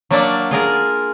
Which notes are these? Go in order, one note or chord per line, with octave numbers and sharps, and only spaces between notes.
F#3 A#3 D4 D5 E5
F4 G#4 A#4